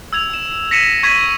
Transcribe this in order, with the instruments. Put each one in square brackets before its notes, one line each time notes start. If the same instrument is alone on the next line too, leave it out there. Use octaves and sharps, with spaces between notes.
[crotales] E6 G#6 F7
E7
A#6 B6 C#7 D#7 E7
C#6 G#6 B6 C#7 D#7 F#7